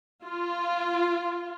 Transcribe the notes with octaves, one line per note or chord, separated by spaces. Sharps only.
F4